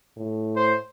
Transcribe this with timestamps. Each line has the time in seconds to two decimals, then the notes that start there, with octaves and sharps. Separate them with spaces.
0.17 A2
0.56 C5